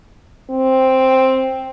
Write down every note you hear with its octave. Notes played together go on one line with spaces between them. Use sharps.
C4